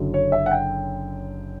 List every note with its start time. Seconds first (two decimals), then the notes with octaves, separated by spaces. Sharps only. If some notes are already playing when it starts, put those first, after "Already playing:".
Already playing: F#1 F#2 D3 F#3
0.14 C#5
0.32 E5
0.46 F#5
0.51 G5